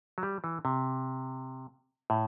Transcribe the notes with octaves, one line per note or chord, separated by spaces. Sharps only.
F#3
G3
E3
C3
A2